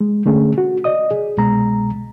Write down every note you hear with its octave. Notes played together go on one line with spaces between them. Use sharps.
G#3
D3 A3 C#4 G#4
F#4
D5 D#5 D#6
G#4
C2 B2 G#3 A#5